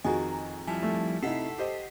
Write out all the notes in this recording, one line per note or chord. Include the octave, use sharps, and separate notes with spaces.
F2 D#3 F#4 G#4 D#5 G#5 A#5
F3 G3 E4 G#5 A5
A3
C3 D#4 E4 A4 F#5 B6 C7
G4 C5 D#5